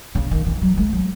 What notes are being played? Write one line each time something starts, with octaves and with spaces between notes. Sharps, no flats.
C#3
D#3
E3
F#3
G#3
F#3